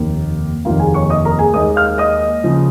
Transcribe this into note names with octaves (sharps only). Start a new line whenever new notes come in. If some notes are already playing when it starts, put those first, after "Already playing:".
Already playing: F1 D#2 D#3 A#3
F1 D#2 D#3 A#3 F4 F5
G#4 G#5
C#5 C#6
D#5 D#6
A#4 A#5
G#4 G#5
D#2 D#3 G#3 D#5 D#6
F5 F6
D#5 D#6
C#3 F3